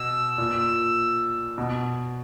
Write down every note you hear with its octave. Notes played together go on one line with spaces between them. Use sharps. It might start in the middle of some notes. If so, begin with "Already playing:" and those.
Already playing: B2 E6
A#2
B2